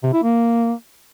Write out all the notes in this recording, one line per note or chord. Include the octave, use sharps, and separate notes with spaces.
C3
E4
A#3